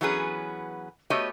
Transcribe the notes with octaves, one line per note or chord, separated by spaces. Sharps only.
E3 F#3 B3 C#4 G#4 B4
A3 B3 F#4 G4 C#5 D#5